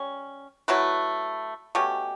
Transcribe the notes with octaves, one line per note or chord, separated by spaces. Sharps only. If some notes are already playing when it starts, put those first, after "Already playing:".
Already playing: G3 C#4
F#3 A3 E4 B4
B2 A3 C#4 G4